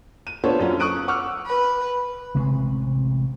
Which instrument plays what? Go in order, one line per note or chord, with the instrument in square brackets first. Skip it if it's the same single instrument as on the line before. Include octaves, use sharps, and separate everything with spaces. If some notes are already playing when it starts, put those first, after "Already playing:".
[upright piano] D#7
B3 D4 F4 A4 C5 C#5
F#2 C#4 F4
C#6 D#6 F#6 D7 D#7
F#5 C#6 D6 E6 F6
[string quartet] B4
[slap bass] A1 C3 G#3 C4